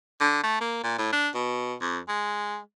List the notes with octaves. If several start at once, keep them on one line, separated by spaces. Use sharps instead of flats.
D3
A3
A#3
A#2
A2
D4
B2
F2
G#3